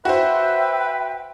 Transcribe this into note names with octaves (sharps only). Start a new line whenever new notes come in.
F#4 B4 C5 E5 G5